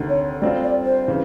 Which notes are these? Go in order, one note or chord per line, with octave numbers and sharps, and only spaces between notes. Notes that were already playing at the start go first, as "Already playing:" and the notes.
Already playing: D2 C3 D#3
C#5
G3 C4 F4 D5
D5
C5
C#3 E3